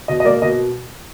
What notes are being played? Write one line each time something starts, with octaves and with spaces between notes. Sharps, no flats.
B2 D#5
D#5
A#3 D5
B2 D#5